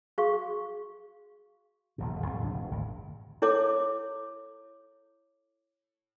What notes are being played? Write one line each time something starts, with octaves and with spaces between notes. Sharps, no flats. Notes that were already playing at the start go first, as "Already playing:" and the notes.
F#4 G#4 F5 C#6
D#1 A#1 B2
E1 D3
A#1 F#2 A2 C4
G#1 C#2 F3 D4
E1
G#1 D2 G2
E4 A4 C#5 D6